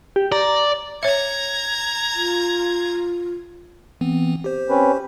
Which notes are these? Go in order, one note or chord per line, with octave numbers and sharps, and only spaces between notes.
G4
D5 A#5
C#5 E5 A#5 G#6
F4
E3 B3 C4
G4 C5
C4 C#4 B4